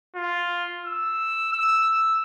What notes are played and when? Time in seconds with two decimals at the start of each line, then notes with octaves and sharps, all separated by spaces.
0.16 F4
0.85 E6
1.53 E6